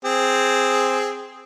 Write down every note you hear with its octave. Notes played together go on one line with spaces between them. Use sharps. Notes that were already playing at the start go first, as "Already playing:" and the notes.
C4 G#4